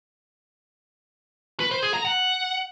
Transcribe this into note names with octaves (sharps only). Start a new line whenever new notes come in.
B4
C5
G#4
A#5
F#5